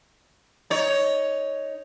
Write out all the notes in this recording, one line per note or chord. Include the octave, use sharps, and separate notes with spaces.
D#4 C#5